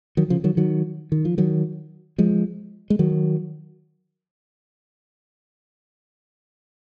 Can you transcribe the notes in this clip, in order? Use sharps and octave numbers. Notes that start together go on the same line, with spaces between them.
D#3 F#3
C#3 F3
D#3 F#3
D#3 F#3
D#3
F3
D#3 F#3
F3 G#3
G#3
D#3 F#3